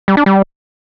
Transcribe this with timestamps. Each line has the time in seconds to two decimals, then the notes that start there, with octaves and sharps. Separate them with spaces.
0.08 G3
0.17 D4
0.26 G3